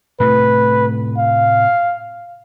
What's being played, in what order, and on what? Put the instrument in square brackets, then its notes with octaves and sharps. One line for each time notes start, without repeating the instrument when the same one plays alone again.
[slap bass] A2 C3 A3 [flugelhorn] B4
[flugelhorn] F5